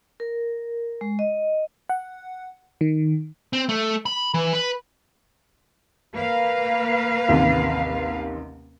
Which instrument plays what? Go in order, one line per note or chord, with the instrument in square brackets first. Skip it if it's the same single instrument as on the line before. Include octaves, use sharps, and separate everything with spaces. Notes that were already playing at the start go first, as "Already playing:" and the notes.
[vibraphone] A#4
G#3
D#5
[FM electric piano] F#5
D#3
[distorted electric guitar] C4
A3
B5
E3
B4
[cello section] A#3 B4 F5
[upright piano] A1 D#2 C3